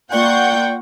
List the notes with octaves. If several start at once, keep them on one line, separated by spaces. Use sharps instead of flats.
A#3 F4 D5 F#5 G5 C#6 G6